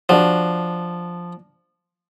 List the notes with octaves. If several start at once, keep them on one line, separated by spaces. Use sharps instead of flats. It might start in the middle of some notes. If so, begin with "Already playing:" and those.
F3 D4 F#4